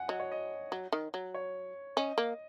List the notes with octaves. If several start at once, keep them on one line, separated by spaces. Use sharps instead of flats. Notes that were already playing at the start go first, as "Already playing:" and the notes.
Already playing: F#5 G#5
F#3 D#5
C#5
D#5
F#3
D#3
F#3
C#5
C#4 D#5
A#3